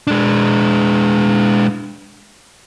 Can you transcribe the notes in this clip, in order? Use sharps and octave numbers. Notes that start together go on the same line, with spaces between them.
G#3 D4